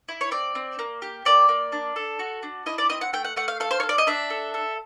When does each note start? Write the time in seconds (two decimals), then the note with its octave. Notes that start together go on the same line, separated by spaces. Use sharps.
0.09 E4
0.21 C#5
0.31 C4 D5
0.55 C4
0.79 A#3
1.02 G4
1.25 A#3 D5
1.49 A#3
1.72 D4
1.96 A4
2.19 F#4
2.43 D4
2.66 E4 D#5
2.78 D5
2.90 C4 D#5
3.01 F#5
3.13 A3 G5
3.25 F#5
3.36 A3 F#5
3.48 F5
3.60 A4 F5
3.71 C5
3.80 C#5
3.83 A4
3.89 D5
3.98 D#5
4.07 D4 E5
4.30 A4
4.54 A4